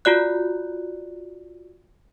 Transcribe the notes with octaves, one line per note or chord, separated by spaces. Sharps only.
F4 F#4 D5 F#6